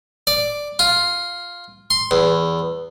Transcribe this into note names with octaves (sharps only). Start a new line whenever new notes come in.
D5
F4
C6
E2